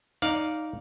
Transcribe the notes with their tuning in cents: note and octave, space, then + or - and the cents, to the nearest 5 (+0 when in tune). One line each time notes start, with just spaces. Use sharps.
D#4 +0 D5 -15 F5 +5